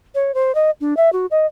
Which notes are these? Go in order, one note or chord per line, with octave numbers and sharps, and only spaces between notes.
C#5
C5
D#5
D4
E5
F#4
D#5